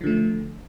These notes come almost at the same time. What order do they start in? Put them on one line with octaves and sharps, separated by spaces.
F3 D3 A3